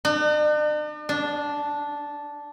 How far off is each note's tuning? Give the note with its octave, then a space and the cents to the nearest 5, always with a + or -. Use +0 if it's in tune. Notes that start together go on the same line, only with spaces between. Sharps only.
D4 +45
D4 -10